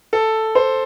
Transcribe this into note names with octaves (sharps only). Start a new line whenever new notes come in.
A4
C5